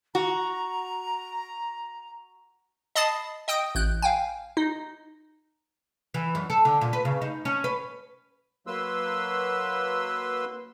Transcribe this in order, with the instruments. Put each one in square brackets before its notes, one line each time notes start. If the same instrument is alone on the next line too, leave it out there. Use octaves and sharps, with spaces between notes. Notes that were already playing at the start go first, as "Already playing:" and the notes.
[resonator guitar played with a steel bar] F#4 [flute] A#5
[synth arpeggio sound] D#5 A5 B5 D#6 A6 C7
D#5 G5 D#6 D7
A1 F#6 G6
F5 G5 G#5
D#4
[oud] E3
F#2
A4
D3
A#2
B4
C#3
D#4
C#4
B4
[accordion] F#3 A#3 B4 C6 E6